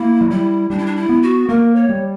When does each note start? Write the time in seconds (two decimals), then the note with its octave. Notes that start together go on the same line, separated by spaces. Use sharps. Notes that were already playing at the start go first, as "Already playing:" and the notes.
Already playing: A#3 E4
0.21 F#3
0.30 G3 E4
0.70 G3 D4
0.78 E4
0.86 D4
0.96 E4
1.09 B3
1.23 F#4
1.49 A#3 A#4
1.76 C#5
1.89 G3